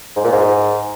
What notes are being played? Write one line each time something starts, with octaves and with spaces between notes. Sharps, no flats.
G#2
A#2
G#2